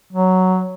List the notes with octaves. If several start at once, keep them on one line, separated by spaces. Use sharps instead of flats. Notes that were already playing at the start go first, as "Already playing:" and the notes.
F#3